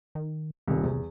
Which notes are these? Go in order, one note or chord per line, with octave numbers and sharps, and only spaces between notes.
D#3
D#1 C2 D#3
E2 C3